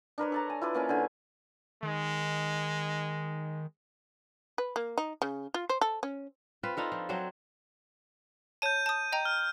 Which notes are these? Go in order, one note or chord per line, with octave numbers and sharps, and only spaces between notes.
D4 A#4 B4 C#5
A4 A5 A#5
G#5
E4 F4 B4 D5
A#3 C#4 B4
D3 G#5
D#3 G#3
B4
A#3
D#4
C#3
F4
C5
A4
C#4
C4 F4 B4
D4 D#4 F4 A4
F3
F#3 C4 D4 C5
C#5 A5 G6 D#7
A5 D#6
D#5 G5 A#5
F6